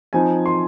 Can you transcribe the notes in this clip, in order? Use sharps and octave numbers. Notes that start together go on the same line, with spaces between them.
F3 C4 D#4 G#5
C6